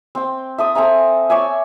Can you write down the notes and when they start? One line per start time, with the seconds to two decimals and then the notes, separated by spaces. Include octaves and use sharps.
0.15 C4 G5
0.58 E5 A5 D#6
0.75 C4 A4 G#5 A#5
1.30 C#5 D5 E5 G#5